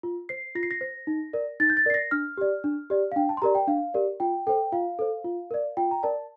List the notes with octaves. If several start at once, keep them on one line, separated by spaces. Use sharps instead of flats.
F4
C5 C7
F4 A#6
C7
A#6
C5
D#4
A#4 D5
D#4 A6
G6
A6
A#4 D5 C7
A#6
D4 F6
G4 D5
D4
G4 D5
F5
D4 G5
A5
C6
G4 A#4 D5 A#5
G5
D4 F5
G4 A#4 D5
F4 G5
A4 C5 G5
F4 F5
A4 C5
F4
A#4 D5
F4 G5
A#5
A#4 D5 A5